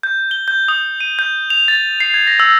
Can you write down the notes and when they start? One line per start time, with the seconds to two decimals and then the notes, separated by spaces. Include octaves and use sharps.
0.03 G6
0.31 G7
0.48 G6
0.68 D#6
1.00 D#7
1.19 G6
1.50 F7
1.68 A6
2.00 C7
2.14 G#6
2.27 A#6
2.40 E6